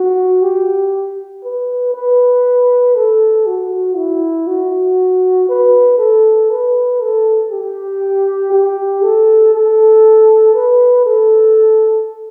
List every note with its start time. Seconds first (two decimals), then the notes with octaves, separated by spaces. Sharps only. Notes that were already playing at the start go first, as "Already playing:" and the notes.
Already playing: F#4
0.42 G4
1.44 B4
1.94 B4
2.95 A4
3.46 F#4
3.97 E4
4.47 F#4
5.49 B4
5.99 A4
6.50 B4
7.01 A4
7.51 G4
8.52 G4
9.03 A4
9.54 A4
10.55 B4
11.06 A4